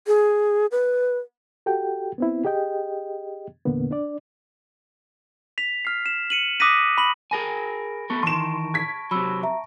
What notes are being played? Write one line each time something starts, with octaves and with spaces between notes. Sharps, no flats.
G#4
B4
F#4 G4 A4 G5
B3 C4 E4
G4 G#4 D#5 G5
E2 A#2 D3 A#3 B3
D4 D5
B6 F7
F6 C7
E7
C#7 D#7 F#7
D6 D#6 F#6 A#6 B6 D#7
B5 F#7
G#4 A#4 G#5 B5 A#6 D7
A3 B3 A4 C#6
D#3 E3 A5 C6 D7 E7
G#6 B6
C3 F#3 B5 E6
E5 A#5